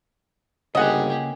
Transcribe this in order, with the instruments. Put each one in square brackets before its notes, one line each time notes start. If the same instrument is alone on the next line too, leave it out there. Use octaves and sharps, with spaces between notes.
[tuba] G1 [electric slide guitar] C#3 A#3 C#4 [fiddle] G4 G#4 [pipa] D#5 F#5